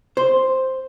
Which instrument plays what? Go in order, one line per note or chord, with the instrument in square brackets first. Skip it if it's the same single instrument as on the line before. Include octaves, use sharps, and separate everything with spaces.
[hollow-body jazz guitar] C5